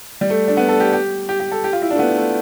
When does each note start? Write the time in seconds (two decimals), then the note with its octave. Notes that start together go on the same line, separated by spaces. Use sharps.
0.21 G3
0.30 A3
0.48 D4
0.57 B3
0.69 A4
0.80 G4
0.93 G4
1.29 G4
1.40 G4
1.51 A4
1.64 G4
1.73 F4
1.82 E4
1.91 D4
1.95 A3
1.99 B3
2.17 A3